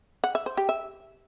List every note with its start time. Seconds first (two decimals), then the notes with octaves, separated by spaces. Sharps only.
0.24 F#5
0.35 E5
0.46 C5
0.57 G4
0.69 E5